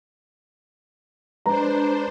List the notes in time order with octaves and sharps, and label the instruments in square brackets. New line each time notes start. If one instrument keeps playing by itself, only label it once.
[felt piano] G#3 B4 A#5 [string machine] D4 C5